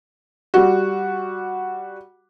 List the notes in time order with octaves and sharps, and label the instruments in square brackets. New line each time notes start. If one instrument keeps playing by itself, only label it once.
[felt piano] G3 F#4